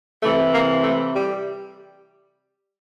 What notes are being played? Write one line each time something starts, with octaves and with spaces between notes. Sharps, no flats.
C3 E3 A3
A#3
A3
G3